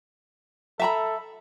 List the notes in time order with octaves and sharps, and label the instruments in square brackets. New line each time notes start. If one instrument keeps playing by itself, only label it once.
[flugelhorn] A4 [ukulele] E5 A#5 B5